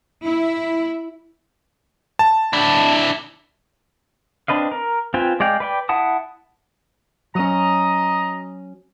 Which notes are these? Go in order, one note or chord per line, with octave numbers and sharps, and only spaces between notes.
E4
A5
D4 E4
C4 D4 B4 D#5 F5
A#4
C4 F4 B4 G5 G#5
G#3 D5 F5 G5
B4 D5 G5
E4 F#5 A5 D#6
F#3 C#4 D#5 A#5